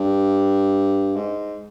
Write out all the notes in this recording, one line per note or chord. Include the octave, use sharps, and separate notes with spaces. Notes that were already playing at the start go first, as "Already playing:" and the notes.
Already playing: G2
G#2